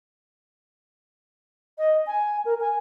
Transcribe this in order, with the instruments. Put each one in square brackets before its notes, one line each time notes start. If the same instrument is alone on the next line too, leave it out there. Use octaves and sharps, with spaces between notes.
[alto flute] D#5
G#5
A#4
G#5